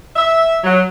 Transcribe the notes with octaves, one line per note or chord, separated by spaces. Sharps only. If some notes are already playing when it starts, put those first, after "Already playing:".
E5
F#3